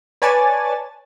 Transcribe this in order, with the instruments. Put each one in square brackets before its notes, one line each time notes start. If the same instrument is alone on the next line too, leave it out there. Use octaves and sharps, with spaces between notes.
[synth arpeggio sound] B4 C#5 D5 G#5 A5 A6